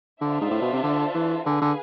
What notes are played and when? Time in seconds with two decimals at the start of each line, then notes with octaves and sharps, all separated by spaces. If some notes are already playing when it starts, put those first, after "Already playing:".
0.21 D3 D4 F4 A4 C5 E5
0.41 G#2
0.51 A2
0.61 B2
0.73 C3
0.83 D3
1.15 E3
1.45 D3 G#4 B4 F5 G#5
1.62 D3